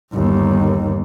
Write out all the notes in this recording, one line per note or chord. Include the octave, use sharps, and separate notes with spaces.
G1 D#2